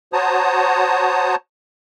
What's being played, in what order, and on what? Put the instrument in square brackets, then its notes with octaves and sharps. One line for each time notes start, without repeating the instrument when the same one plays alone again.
[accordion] F#4 C5 C#5 A5 A#5 D#6